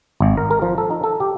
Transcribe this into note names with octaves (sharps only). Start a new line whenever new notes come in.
G#1
A#4
A#4
F3
A4
D#4
A4
G4